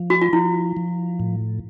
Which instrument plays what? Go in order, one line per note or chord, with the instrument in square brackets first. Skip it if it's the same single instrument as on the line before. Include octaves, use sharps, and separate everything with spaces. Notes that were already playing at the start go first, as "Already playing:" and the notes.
Already playing: [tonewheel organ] F3
[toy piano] F#4
F4
[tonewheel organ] F3 [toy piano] E4
[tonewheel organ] F3
A2